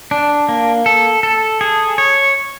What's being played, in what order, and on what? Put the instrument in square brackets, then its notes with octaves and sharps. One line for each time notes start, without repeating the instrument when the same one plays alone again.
[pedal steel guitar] D4
A#3
A4
A4
G#4
C#5